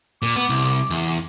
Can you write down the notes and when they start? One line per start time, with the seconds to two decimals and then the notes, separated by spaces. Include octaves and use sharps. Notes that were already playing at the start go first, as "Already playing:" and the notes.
0.22 A#2 D6
0.36 B3
0.49 C2
0.90 E2